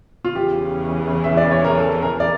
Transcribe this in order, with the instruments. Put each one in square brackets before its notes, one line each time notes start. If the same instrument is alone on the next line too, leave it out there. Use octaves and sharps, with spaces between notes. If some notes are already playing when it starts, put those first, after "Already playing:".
[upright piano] F4
[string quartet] E2 C#3 E3 [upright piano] G4
[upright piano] E5
D5
C#5
A#4
A4
A#4
D5